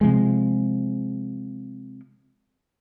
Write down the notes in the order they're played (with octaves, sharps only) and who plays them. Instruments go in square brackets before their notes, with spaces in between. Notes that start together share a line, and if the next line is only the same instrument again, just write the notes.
[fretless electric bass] C3 F3 G#3